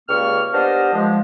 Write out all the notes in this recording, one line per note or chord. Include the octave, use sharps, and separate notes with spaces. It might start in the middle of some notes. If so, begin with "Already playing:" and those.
C#2 G3 A#3 C#6 F6
B3 D4 G4 A#4 C5 D#5
F3 G#3